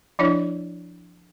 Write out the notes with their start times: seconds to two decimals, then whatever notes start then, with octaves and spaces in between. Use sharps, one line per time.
0.19 F3 D4 E4 C#5 D#5